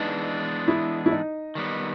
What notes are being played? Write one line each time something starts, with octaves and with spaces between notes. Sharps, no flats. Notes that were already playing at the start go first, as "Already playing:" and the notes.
Already playing: E3 G#3 B3 D4 D#4
E4
E4
D#4
D#3 G3 B3